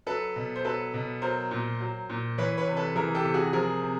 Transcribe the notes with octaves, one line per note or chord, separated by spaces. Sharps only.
F#3 A4 B4
B2
C5
F#3 A4 B4
B2
F#3 A#4 C5
A#2
F#3
A#2
E3 B4 C#5
B4 C#5
C3
A4 B4
E3 G#4 A#4
G4 A4
C3
F#4 G#4
F3 G#4 A#4
C3